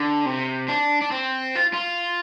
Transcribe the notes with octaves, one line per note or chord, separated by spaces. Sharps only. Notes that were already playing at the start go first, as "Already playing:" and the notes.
Already playing: D3
C3
D4
D4
C4
F4
F4